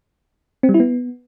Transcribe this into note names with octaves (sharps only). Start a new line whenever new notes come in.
C4
G3
E4
B3